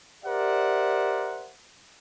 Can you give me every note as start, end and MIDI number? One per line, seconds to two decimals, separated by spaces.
0.25 1.52 67
0.25 1.52 70
0.25 1.52 72
0.25 1.52 74
0.25 1.52 76
0.25 1.52 78